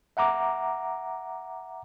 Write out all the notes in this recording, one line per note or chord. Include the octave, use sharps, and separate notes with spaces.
E5 F#5 A#5 D6